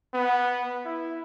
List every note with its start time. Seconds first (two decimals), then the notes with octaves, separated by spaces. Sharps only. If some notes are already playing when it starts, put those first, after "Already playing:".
0.14 B3
0.86 E4